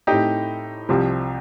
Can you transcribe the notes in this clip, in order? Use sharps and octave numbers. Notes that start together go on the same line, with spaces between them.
A2 A3 C4 D#4 G4
C2 C3 F3 C4